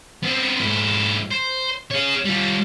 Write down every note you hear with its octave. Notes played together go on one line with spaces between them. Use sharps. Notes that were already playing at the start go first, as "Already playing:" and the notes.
B3 C4
G#2 E4
C5
G#4 C#5
G3 F4